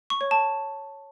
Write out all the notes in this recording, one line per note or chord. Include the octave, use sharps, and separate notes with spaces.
C#6
C#5
A5